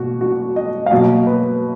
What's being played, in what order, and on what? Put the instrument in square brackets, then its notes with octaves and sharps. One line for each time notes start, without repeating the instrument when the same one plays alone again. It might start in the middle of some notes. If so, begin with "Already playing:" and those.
Already playing: [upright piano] B2 A#3 F#4
F#4
D#5
F5
B2 F#3 A#3 D#5
B4